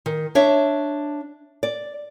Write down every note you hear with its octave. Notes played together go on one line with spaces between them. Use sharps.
D#3
D4 C#5 E5
D5